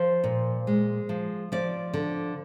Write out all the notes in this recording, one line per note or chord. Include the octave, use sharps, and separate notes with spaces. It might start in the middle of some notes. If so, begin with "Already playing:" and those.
Already playing: F3 C5
A#2
G#3
F3
F3 D5
D3